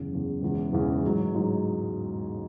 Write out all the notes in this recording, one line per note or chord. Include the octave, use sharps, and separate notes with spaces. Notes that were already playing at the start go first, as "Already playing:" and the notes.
Already playing: F#1 E2 C#3
F#1 E2 C#3
E1 E2 C#3 E3
E1 E2 C#3 E3
A1 G#2 F#3
A1 G#2 F#3